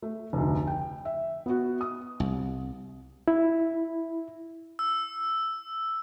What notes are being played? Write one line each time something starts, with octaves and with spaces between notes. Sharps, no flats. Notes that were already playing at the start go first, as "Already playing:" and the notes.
A3
F1 D2
G5
E5
B3 F#4
D#6
C2
E4
E6